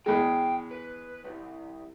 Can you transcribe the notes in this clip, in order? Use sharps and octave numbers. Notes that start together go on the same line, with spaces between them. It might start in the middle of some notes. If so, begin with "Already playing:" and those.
E2 G#3 G5
B4
C2